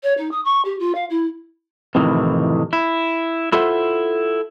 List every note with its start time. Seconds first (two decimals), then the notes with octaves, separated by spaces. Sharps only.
0.03 C#5
0.17 D#4
0.31 D#6
0.45 C#6
0.65 G4
0.79 F4
0.95 F5
1.10 E4
1.95 F2 A2 C3 D#3 E3
2.73 E4
3.52 E4 F4 A4 C5 E5 F#5